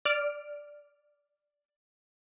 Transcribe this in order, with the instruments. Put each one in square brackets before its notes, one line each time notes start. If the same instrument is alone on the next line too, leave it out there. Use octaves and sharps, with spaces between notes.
[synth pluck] D5 F6 D7